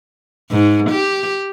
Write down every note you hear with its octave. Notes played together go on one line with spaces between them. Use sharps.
G#2
G4